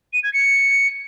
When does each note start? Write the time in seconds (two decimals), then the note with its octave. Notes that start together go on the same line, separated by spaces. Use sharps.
0.13 D#7
0.23 G#6
0.34 C#7